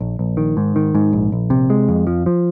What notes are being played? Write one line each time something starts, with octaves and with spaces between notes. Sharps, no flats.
A#1
A#1
D#3
G#2
D#3
G#2
A#1
A#1
C3
G#3
F2
F3
F3